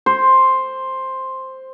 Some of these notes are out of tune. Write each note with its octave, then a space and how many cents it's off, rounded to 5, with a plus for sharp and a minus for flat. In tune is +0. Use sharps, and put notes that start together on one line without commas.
C5 +5